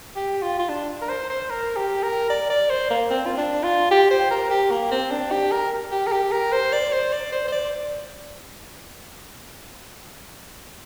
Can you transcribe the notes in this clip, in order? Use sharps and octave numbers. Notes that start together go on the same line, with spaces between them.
G4
F4
F4
D4
A#4
C5
C5
A#4
G4
A#4
D5
D5
C5
A#3
C4
F4
D4
F4
G4
C5
A#4
G4
A#3
C4
D4
G4
A#4
G4
A#4
G4
A#4
C5
D5
C5
D5
C5
C5
D5